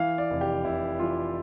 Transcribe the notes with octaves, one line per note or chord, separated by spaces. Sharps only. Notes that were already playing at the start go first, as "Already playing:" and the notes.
Already playing: E3 F5
D5
F1
G4
F1 E4
E3 F4